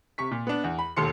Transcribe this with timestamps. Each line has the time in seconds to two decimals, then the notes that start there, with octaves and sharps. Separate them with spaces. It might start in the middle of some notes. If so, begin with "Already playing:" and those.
0.18 C3 C#6 B6
0.31 A#2
0.47 B3 D4
0.64 E2
0.79 B5
0.97 E1 D#2 A4 C6 C#7